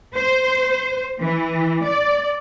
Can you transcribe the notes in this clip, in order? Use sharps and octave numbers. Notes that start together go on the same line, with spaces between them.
C5
E3
D5